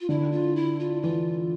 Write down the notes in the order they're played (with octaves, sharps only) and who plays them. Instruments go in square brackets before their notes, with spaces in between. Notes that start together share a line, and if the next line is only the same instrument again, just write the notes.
[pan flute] F4
[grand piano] D3 [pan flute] E4
[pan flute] F4
E4
F4
[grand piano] E3 [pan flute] F4